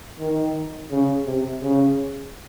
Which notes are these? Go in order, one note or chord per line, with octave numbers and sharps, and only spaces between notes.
D#3
C#3
C3
C#3